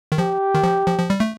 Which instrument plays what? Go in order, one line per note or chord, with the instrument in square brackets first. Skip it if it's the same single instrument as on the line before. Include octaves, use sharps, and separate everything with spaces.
[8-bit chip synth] D#3
[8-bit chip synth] F3 [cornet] G4
[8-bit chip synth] D#3
F3
F3
F3
G3
A3